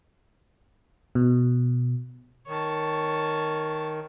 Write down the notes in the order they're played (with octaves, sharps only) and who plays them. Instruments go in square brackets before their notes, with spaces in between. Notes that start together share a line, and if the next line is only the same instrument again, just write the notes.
[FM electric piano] B2
[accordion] D#3 [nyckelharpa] C#5 A5